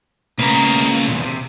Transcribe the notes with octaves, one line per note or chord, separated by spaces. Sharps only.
C#3 A#3 B4 A#5
E2 A#2
C3